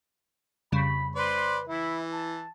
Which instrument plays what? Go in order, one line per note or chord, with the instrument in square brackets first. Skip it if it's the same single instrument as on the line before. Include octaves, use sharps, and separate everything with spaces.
[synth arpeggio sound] F2 C#3 G3 [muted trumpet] B5
[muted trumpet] B4 [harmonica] C5 D5 C6
[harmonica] E3 [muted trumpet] E4
[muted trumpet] A5